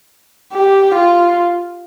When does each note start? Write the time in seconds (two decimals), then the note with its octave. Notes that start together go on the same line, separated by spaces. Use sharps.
0.54 G4
0.95 F4